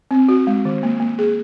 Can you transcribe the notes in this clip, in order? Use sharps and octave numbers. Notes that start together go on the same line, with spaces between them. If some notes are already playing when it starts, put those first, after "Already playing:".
C4
F#4
G#3
D#3
A#3
A#3
G#4